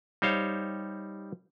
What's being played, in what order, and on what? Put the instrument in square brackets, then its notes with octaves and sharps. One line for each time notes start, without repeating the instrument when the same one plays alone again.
[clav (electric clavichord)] G3 D#4 C5 C#5 F5